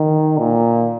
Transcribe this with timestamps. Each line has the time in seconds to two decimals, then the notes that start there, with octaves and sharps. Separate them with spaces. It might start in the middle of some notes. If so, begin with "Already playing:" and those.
Already playing: D#3
0.39 A#2